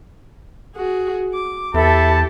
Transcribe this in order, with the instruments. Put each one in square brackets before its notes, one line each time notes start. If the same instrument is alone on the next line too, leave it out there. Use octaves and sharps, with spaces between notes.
[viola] F#4 G#4
D6
[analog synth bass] E2 [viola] G4 [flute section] A4 E5 B5 [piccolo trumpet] A5